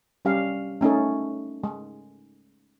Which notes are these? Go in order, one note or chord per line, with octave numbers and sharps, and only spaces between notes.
G3 C#4 G4 F5
A3 C#4 D#4 A4
G#3